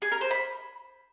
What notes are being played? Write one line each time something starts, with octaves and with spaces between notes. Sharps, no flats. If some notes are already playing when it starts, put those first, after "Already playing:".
G#4
A#4
C5
B5